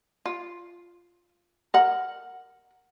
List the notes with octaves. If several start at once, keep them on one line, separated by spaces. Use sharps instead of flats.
F4
A#4 F#5